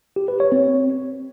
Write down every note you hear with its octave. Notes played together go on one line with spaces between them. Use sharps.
G4
B4
C#5
C4